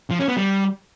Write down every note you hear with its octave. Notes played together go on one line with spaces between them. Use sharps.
F3
C#4
B3
G3